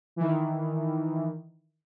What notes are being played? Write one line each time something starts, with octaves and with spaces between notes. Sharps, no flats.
D#3 E3